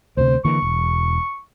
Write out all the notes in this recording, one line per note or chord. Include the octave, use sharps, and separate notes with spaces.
D2 C3 C5
D3 E3 A#3 C#6
E1